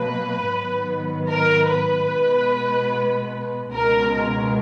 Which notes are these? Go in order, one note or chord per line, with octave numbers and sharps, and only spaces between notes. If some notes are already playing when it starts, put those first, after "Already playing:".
Already playing: B2 F#3 A#3 B4
G#2 D#3 F#3 B3
A#4
B4
B2 G#3 B3
C#2 B2 G#3 A#4
A#4